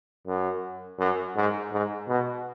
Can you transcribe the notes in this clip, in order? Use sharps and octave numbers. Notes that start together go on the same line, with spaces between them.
F#2
F#2
G#2
G#2
B2